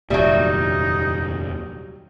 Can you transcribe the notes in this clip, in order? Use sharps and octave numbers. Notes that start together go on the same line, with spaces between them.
F1 D#2 A#2 F#3 G3 D#4 G4 E5